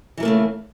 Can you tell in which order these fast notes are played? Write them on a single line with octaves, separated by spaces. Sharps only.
E3 F#3 A#3 A3 C#3